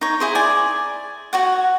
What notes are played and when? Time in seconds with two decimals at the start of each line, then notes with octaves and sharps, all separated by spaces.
0.01 D#4 C#5
0.20 E4 G#4 C5
0.35 D5 G#5
1.33 F#4 C#5 F#5